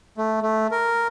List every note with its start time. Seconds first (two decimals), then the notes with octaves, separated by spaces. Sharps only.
0.17 A3
0.42 A3
0.71 A#4